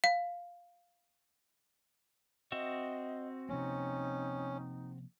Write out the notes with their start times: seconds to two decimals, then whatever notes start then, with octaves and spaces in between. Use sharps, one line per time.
0.04 F5
2.52 C4 F#4 D#5 E5
3.49 C3 F3 A#3 C#4 D#4